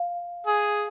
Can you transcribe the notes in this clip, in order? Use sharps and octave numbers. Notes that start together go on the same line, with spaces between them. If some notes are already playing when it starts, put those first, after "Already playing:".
Already playing: F5
G#4